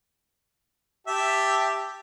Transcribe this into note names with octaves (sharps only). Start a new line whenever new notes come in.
G4 E5 A5